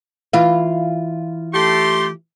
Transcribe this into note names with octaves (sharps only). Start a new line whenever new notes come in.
E3 F4 F5
A3 G4 C6